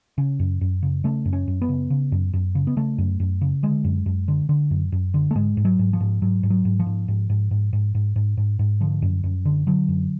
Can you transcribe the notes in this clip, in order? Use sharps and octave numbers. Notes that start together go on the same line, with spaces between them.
C#3 C#4
F#2
F#2
C#3
C#3 A3
F#2
C#4
F#2
B3
C#3
C#3
F#2
F#2
C#3
B3
C#3 A3
F#2
F#2
C#3
D3 G#3
F#2
F#2
D3
D3
F#2
F#2
D3
A3
G#2 G#3
G#2
F#3
G#2
F3
G#2
G#2 F#3
G#2
F#3
G#2
F3
G#2
G#2
G#2
G#2
G#2
G#2
G#2
G#2
G#2
D3 F3
F#2
F#2
D3
D3 F#3
F#2